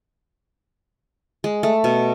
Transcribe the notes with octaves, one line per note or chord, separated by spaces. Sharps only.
G#3
A3
B2